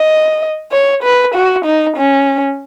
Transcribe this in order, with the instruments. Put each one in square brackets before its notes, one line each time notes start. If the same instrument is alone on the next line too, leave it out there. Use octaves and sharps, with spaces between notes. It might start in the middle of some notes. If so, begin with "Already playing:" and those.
Already playing: [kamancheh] D#5
C#5
B4
F#4
D#4
C#4